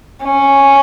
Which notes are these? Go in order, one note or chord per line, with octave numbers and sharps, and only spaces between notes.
C#4